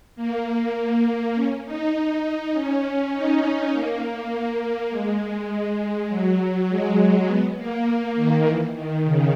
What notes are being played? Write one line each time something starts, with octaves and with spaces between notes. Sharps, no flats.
A#3
C#4
D#4
D#4
C#4
D#4
C#4
A#3
G#3
F#3
G#3
G#3
B3
A#3
D#3
E3
D#3
C#3